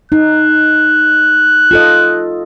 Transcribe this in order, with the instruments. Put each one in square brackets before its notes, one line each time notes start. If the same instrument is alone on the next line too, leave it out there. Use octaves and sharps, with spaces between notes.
[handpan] D#4 [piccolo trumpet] F#6
[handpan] F4 A4 D#5